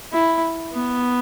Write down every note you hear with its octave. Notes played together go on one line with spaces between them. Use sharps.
E4
B3